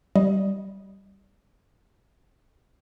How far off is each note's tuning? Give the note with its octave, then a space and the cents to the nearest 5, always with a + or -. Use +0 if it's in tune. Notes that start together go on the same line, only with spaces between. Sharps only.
G3 -10 D#5 +0